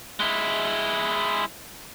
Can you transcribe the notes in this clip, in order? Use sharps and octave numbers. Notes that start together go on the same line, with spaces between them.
G#3 E4